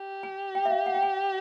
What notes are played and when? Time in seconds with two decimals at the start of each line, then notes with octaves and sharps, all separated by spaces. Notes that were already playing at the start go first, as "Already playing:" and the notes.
Already playing: G4
0.23 G#5
0.55 G5
0.65 E5
0.71 F5
0.86 F#5
0.95 G5
1.03 G#5